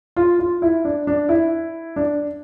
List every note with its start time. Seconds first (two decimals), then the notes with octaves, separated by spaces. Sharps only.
0.16 F4
0.39 F4
0.62 E4
0.85 D4
1.07 D4
1.29 E4
1.96 D4